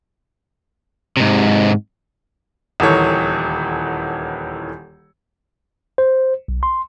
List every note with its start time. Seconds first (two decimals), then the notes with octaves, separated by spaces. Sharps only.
1.17 G#2 C3
2.80 D#1 D2 D#3 E3 A4 C#5
5.98 C5
6.48 B1
6.63 C6